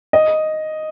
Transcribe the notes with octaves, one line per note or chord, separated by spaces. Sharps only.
D#5